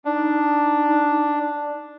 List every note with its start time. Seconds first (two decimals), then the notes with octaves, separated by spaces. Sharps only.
0.05 D4 D#4